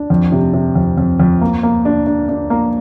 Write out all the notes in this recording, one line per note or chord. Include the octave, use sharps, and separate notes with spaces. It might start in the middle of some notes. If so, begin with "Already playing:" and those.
Already playing: D4
F2
C3
C3
F2
F2
F2
A#3
A#3
D4
D4
D4
A#3